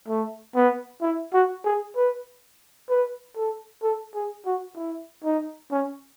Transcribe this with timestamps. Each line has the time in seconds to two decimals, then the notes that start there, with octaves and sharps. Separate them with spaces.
0.08 A3
0.55 B3
1.02 E4
1.33 F#4
1.65 G#4
1.96 B4
2.89 B4
3.36 A4
3.83 A4
4.15 G#4
4.46 F#4
4.77 E4
5.25 D#4
5.71 C#4